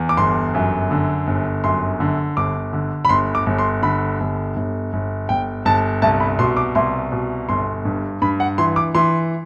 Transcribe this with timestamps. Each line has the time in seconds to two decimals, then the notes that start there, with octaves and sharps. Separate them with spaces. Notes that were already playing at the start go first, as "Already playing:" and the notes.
Already playing: E2
0.09 D6
0.17 G1 C6
0.54 F#2
0.91 D3
1.27 G1
1.64 F#2 C6
2.00 D3
2.37 G1 D6
2.73 D3
3.05 B5
3.09 G1 C6
3.35 D6
3.46 G1
3.58 C6
3.82 D3 B5
4.20 G1
4.56 G1
4.93 G1
5.29 G1 G5
5.65 G1 A5
6.02 C2 A5
6.20 B5
6.39 B2 C6
6.57 D6
6.75 C2 C6
7.12 B2
7.49 G1 C6
7.85 G2
8.22 G2 B5
8.40 F#5
8.58 E3 C6
8.76 D6
8.95 E3 C6